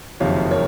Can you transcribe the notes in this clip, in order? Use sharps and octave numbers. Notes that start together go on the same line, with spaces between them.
F#1 F2 C3 D#3 C#5 F5
A#4 C#5